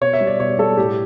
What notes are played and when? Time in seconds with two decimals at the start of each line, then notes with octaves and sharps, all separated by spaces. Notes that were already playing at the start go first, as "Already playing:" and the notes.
0.01 B2 C#5
0.13 E5
0.21 G3
0.27 D5
0.39 B2 C#5
0.58 G3 A4
0.77 A2 G4